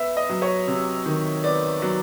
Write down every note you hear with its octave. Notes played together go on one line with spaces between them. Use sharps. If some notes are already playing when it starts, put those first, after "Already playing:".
Already playing: B3 E5
D#5
F#3
C#5
C3
D#3
B3 D5
F#3